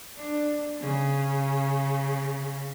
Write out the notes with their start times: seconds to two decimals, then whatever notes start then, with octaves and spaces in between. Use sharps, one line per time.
0.16 D4
0.81 C#3